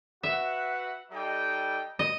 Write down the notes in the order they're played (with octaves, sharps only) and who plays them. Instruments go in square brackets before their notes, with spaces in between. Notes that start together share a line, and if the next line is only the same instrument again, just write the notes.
[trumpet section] F#4 B4 F#5 [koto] E5
[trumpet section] G3 D#4 A4 D#5 G5
[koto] D#5